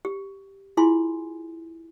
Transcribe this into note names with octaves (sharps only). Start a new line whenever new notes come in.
G4
E4 F4 G#4 G#5 C6